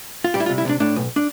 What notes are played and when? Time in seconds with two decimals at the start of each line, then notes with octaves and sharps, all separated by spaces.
0.24 F4
0.34 G3 G4
0.40 E4
0.46 F4
0.50 C3
0.58 E4
0.65 C3 D4
0.80 A2 D4
0.96 B1
1.16 D4